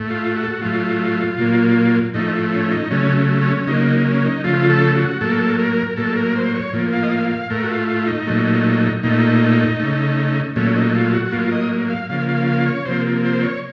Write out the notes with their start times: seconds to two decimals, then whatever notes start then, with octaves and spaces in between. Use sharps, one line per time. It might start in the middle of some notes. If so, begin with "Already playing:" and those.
Already playing: A2 A3
0.10 F4
0.36 F#4
0.44 A4
0.50 F#4
0.61 A2 F#3 A3 F4
1.38 A#2 F#3 A#3
2.14 A2 F3 A3 D#4
2.52 C#4
2.71 D#4
2.90 C#3 F#3 A3 C#4
3.42 C#4
3.67 C#3 F#3 A#3 D#4
3.87 D#4
4.06 C#4
4.25 D#4
4.44 C#3 F3 A3 F4
4.69 A4
4.95 F#4
5.20 A2 F#3 A#3 A4
5.59 A#4
5.96 A2 F#3 A#3 A4
6.17 A#4
6.36 C5
6.54 C#5
6.73 A2 F3 A#3
6.93 F5
7.03 D#5
7.11 F5
7.31 F5
7.50 A2 A3 A#4
7.63 F#4
7.70 F4
7.88 F4
8.07 D#4
8.27 A#2 F#3 A3
9.03 A#2 A3 D#4
9.80 C#3 A3
10.56 A#2 F#3 A3 C#4
10.75 D#4
10.95 F4
11.13 F#4
11.25 F#4
11.32 A2 F#3 A#3 F4
11.52 D#5
11.89 F5
12.09 C#3 F3 A#3 F5
12.29 F5
12.47 F5
12.66 C#5
12.85 C3 F3 A#3 C5
13.24 C5
13.43 C#5